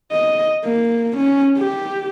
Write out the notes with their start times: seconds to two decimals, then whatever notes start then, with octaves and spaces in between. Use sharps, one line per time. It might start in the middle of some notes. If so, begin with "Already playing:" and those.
0.12 D#5
0.64 A#3
1.17 C#4
1.57 G4